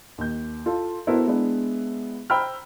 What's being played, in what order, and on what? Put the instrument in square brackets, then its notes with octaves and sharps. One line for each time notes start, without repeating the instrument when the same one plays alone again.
[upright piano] D#2 G6
F4 A4
B3 E4 F#4 A4 A#4 C5
G#3 B3 D4 E4
C5 G5 A#5 B5 E6 F6